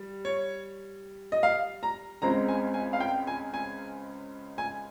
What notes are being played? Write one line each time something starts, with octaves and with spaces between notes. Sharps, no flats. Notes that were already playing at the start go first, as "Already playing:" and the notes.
Already playing: G3
C#5
D#5
F5
A#5
C#2 C#3 G#3 C4 A#5
G#5
G#5
F5
G5
G#5
G#5
G#5